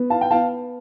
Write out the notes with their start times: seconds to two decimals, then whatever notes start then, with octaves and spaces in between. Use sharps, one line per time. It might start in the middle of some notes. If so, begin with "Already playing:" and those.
Already playing: B3
0.10 F5 A5
0.21 G5
0.31 B3 F5 A5